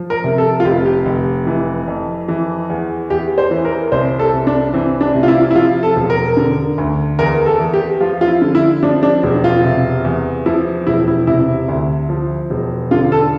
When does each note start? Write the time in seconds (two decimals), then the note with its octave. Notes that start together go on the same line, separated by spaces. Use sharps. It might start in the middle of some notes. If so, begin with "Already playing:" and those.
Already playing: F3
0.10 A#4
0.24 C3
0.38 A4
0.60 F4
0.65 F1 G4
0.86 G4
1.06 F1
1.47 E3
1.88 F2
2.28 E3
2.70 E2
3.10 E2 G4
3.38 C5
3.51 E3
3.65 A#4
3.92 C2 C5
4.19 A4
4.33 C2
4.47 D4
4.74 E3 C4
5.01 D4
5.14 C3
5.23 F4
5.28 E4
5.51 E4
5.55 F3 F4
5.83 A4
5.96 E1
6.10 A#4
6.37 D3
6.78 D2
7.19 E2 A#4
7.46 A4
7.60 E2
7.73 G4
8.00 F3 F4
8.21 F4
8.28 E4
8.41 D3
8.55 E4
8.82 F3 D4
9.03 D4
9.23 E1
9.44 F4
9.64 C3
10.05 E2
10.46 F3 E4
10.87 E1 E4
11.08 E4
11.27 C3 E4
11.69 D2
12.09 F3
12.50 E1
12.91 D3 F4
13.12 A4